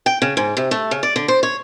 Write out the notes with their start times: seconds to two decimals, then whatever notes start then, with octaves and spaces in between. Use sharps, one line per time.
0.06 G5
0.22 C#3
0.37 G#2
0.57 C3
0.71 A3
0.91 C#3
1.03 D5
1.16 D3
1.28 C5
1.43 C#5